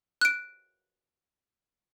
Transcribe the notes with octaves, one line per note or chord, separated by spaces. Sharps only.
F#6 D7